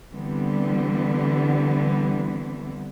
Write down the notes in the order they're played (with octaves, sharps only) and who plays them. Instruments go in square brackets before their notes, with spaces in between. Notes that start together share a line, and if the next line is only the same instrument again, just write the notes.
[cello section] D3 E3 G3 B3 C4